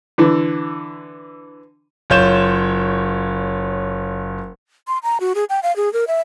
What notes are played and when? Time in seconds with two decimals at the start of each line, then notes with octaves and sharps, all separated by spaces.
0.18 D3 E3
2.10 F#1 F4 C#5 G6 E7
4.88 C6
5.03 A#5
5.20 F#4
5.35 G#4
5.50 G5
5.63 F5
5.76 G#4
5.93 A#4
6.08 E5